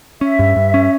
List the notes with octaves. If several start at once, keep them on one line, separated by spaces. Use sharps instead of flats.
C#4 E5
G2
G2
C#4